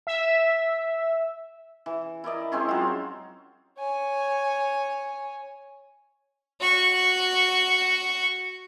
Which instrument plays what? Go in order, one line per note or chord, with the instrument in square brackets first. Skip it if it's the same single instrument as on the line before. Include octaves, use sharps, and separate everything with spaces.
[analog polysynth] E5
[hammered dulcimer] E3
E4 A#4 D5 D#5
G#3 C4 C#4 E4
F#3 F4
[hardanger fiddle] C#5 G#5
[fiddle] F#4 C#6